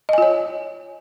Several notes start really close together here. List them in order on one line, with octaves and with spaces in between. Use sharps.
D#5 G#5 F4 C#5